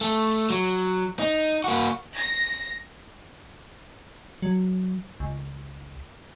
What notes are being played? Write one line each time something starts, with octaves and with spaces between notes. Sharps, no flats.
A3
F#3
D#4
A#3 F#4
A#6
F#3
C#2